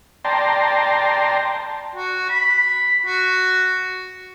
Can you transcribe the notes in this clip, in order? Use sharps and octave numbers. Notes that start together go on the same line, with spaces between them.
D5 G5 A5 A#5 C6
F#4
B5
F#4